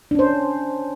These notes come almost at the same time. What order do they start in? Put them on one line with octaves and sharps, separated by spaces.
D4 C#4 C5